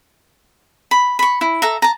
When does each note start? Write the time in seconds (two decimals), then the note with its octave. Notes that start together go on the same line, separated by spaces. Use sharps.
0.91 B5
1.19 B5 C#6
1.41 E4
1.62 A4 E5 A#5
1.82 A5 A#5